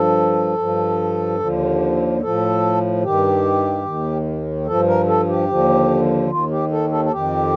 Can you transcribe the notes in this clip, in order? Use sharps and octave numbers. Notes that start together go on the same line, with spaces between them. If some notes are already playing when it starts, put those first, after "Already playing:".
Already playing: G2 F3 A4
G2 F3
D#2 D3 F3
A2 F3 A4
G2 D#3 G4
D#2 D#3
G2 F3 A4
A#4
A4
G4
D#2 D3 F3
D#2 D#3 F4
G4
A4
A4
A4
F2 D#3 G4